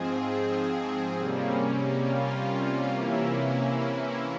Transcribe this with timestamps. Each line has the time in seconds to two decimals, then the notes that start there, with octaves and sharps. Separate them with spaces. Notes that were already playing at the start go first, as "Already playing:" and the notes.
Already playing: G#2 F3 C4 G#4
1.16 C3 G3 A#3 C#4
2.04 F4
2.92 C3 E3 A#3 C#4 E4